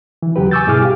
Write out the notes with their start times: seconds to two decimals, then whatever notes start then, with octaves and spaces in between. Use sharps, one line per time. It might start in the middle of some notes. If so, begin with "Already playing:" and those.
0.22 E3
0.36 E2 C#3 F#3 G4 B4
0.51 G#5 C#6 D6 E6 G6 A6
0.67 G2 B2 E4 G#4 D6 F6
0.81 G4 F5